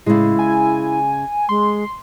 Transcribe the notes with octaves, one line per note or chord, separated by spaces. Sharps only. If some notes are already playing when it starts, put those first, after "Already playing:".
A2 C#3 G#3 E4
G#5
G#3 C6